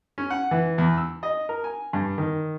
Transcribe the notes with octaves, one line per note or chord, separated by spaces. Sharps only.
C#4
F#5
E3
E2
E6
D#5
A#4
G#5
G2
D#3